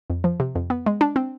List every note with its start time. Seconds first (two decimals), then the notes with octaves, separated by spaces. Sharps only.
0.10 F2
0.24 F3
0.40 C3
0.55 F2
0.70 B3
0.86 G#3
1.01 D4
1.16 C4